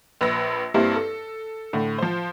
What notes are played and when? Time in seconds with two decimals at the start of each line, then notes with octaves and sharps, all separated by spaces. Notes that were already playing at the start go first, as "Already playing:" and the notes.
0.21 A#1 B4 E6 A#6
0.74 G2 G3 A#3 C4 E4
0.96 A4
1.73 A2 D3
1.98 F3 C5